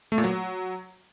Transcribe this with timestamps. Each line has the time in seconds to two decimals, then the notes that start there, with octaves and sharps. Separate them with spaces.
0.12 A3
0.18 A#2
0.24 F#3